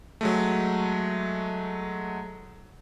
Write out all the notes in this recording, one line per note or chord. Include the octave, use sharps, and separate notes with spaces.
F#3 G#3 A3